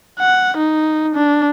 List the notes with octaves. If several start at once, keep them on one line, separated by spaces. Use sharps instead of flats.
F#5
D#4
D4